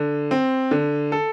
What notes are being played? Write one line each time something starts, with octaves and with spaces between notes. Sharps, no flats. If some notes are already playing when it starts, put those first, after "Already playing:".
Already playing: D3
C4
D3
A4